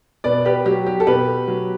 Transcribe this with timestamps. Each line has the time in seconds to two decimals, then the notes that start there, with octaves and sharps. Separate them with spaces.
0.24 B2 B4 D5
0.45 G4 B4
0.65 F#3 G4
0.86 G4
1.00 A4
1.07 B2 G4 B4
1.48 F#3